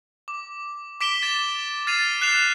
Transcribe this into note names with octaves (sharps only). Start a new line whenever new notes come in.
D6
D6 B6 D7 E7 G7
A6 E7
D6 F6 A6 C7 D#7 F7
F#6 C7 E7 F7